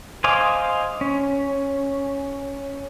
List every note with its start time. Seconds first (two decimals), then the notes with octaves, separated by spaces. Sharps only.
0.24 C5 D#5 F5 G#5 D6
1.01 C#4